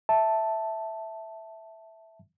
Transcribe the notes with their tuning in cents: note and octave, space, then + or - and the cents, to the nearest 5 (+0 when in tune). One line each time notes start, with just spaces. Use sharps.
E5 -5 A5 +0